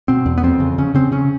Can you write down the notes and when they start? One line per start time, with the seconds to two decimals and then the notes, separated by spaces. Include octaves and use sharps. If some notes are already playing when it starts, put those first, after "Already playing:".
0.08 B2 C4
0.26 E2
0.38 B3
0.43 F2 C4
0.60 C#3
0.78 C#3 C#4
0.95 C#3 C4
1.12 C#3 C#4